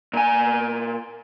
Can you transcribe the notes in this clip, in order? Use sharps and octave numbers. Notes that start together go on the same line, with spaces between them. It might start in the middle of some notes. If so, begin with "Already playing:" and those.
A#2 G#5